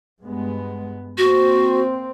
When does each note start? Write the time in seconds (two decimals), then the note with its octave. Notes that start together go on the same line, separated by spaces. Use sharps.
0.20 G2 G#3 B3
1.18 A#3 C4 F#4